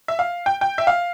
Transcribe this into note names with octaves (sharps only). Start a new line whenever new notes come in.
E5
F5
G5
G5
E5
F5